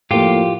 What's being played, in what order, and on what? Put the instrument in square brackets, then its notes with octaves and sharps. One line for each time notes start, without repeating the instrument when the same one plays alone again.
[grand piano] A2 F3 A#3 [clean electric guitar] F4 G4